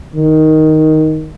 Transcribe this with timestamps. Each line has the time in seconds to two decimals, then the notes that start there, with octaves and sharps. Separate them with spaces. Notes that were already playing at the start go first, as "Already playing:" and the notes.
0.16 D#3